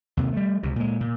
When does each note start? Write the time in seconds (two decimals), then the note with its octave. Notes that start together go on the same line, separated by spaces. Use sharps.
0.17 D#2 C3
0.33 G3 A3
0.63 C#2 C3
0.76 A#2 G#3
1.00 A#2